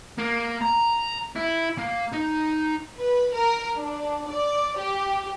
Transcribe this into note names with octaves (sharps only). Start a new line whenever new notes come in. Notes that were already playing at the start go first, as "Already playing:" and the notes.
A#3
A#5
E4
A#3
D#4
B4
A#4
D4
D5
G4